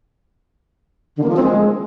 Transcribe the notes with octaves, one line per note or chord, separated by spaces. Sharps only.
D3
A#3
F3
C4
G#3